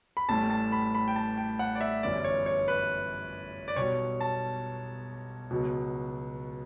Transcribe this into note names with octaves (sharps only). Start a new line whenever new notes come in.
B5
A1 A2 G3 A5
A5
B5
B5
G5
A5
G5
F#5
D5
E5
G1 F#2 E3 G3 D5
C#5
C#5
B4
D5
B1 B2 G3 C#5
A5
C#2 B2 F#3